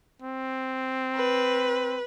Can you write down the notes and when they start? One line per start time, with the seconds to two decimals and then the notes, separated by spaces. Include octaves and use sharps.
0.22 C4
1.16 B4